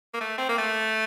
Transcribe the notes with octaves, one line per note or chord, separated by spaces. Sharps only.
A#3
A3
C4
A#3
A3